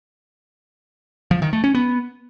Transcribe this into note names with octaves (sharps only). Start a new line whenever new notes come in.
F3
D#3
A3
C#4
B3